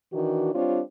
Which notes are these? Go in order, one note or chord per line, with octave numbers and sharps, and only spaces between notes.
D#3 E3 D4 F#4
G3 C4 D4 F4 C#5